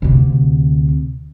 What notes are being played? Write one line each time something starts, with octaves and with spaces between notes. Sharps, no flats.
D2 C3